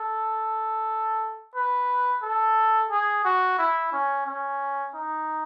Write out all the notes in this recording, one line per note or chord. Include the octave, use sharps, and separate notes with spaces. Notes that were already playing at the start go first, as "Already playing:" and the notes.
Already playing: A4
B4
A4
G#4
F#4
E4
C#4
C#4
D#4